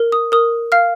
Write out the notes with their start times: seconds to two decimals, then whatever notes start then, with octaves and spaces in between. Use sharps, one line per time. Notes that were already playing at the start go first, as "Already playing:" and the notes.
Already playing: A#4
0.12 D#6
0.32 A#4 D#6
0.72 F5 F6